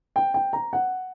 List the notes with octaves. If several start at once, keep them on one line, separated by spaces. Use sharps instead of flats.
G5
G5
A#5
F#5